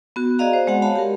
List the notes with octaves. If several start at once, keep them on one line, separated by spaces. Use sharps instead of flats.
B3 F#4
F#4 G#4 D5 D#5 F5 A#5
C5
G#3 C4 F#4 F#5
C#5 F5 A5 B5
G4 A#4